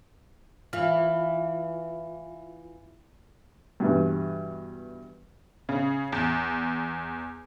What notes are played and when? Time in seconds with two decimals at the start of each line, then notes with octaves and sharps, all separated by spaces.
0.73 E3 F4 F5 F6
3.80 G2 B2 E3
5.69 C#3
6.12 E2